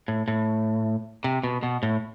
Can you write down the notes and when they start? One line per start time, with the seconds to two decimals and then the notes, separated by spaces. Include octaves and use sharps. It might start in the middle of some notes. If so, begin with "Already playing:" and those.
0.08 A2
0.28 A2
1.24 C3
1.44 B2
1.63 B2
1.83 A2